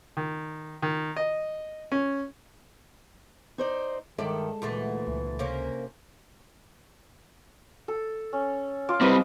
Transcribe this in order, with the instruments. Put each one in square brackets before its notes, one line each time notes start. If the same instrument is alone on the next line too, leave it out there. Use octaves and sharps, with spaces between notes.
[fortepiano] D#3
D#3
D#5
C#4
[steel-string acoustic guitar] D#4 C5 D5
[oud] G2 D5 E5 [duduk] D#3 [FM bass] G#3 [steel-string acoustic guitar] A4
[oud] D2 A#2 A3 [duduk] E3
[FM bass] C#2
[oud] C3 A#3 C#4
[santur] A4
C#4
F4 D6
[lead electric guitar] G3 C4 [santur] B4 D#5 D6